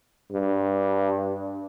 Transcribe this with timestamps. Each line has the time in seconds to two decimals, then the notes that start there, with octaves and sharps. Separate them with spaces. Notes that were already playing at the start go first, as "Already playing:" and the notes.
0.32 G2